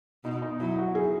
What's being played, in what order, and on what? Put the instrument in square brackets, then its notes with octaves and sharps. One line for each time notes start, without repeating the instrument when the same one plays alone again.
[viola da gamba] B2 [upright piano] D#4
[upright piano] D#4
[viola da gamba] F#3 [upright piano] E4
[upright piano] F#4
G#4